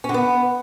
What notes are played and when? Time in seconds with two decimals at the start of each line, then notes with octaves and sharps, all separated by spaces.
0.04 C#4
0.09 D3
0.14 B3